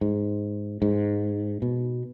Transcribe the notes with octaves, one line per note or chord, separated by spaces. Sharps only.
G#2
G#2
B2